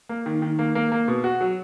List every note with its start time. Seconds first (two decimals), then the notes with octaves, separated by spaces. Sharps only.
0.09 A#3
0.26 D#3
0.42 D#3
0.59 A#3
0.75 A#3
0.92 A#3
1.08 B2
1.24 F#4
1.41 F#3